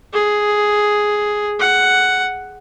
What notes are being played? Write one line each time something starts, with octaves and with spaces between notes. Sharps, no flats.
G#4
F#5